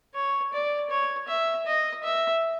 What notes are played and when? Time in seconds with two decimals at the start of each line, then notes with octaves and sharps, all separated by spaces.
0.15 C#5
0.53 D5
0.90 C#5
1.28 E5
1.67 D#5
2.03 E5